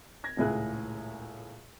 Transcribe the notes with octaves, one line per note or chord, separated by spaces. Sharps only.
G#6 A#6
D#1 C#2 A2 E4 G#4 F#6